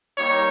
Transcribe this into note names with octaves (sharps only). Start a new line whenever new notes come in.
G3 A#3 D#4 G4 C#5